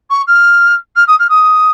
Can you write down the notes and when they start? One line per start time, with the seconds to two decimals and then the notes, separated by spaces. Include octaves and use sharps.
0.10 C#6
0.27 F6
0.95 F6
1.07 D#6
1.19 F6
1.29 D#6